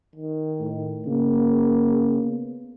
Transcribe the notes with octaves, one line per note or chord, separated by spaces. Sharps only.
D#3
A2
C#3 A#3
B3